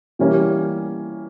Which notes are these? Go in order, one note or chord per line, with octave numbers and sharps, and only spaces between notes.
E3 G3 A#3 C#4